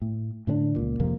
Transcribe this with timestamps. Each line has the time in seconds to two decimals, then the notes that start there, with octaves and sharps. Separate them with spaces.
0.02 A2
0.47 A2 D3 C4 D4
0.76 C#2 A#2
0.99 G#1 F2 C3 A#3